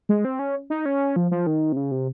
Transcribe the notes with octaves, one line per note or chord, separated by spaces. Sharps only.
G#3
C4
C#4
D#4
C#4
F3
F3
D#3
C3
C#3
C3